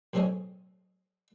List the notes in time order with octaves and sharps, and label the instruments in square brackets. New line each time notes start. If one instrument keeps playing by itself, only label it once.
[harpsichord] B1 A2 C4 C#4 G#4 D#5